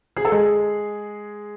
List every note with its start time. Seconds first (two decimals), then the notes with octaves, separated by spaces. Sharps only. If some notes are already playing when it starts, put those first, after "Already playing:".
0.16 G#4
0.25 A4
0.32 G#3 G#4